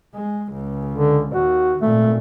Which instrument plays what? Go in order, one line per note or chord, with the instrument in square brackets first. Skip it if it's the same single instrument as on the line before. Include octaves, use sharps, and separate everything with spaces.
[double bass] G#3
C#2
[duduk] D3
[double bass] D#2 [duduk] F#4
[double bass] G#1 A#2 [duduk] A3